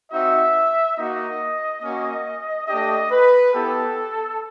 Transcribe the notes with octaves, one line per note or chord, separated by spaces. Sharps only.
C4 D#4 F#4 E5
A#3 D#4 F#4 D#5
A#3 C#4 F#4
A3 D4 G4 D#5
B4
B3 E4 G4 A4